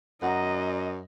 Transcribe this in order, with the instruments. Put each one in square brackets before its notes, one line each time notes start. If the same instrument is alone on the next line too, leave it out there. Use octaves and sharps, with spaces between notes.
[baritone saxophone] F#2 [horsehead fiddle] D#5 [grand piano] F#5 A#5